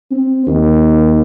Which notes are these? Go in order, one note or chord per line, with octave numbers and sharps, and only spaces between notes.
C4
D#2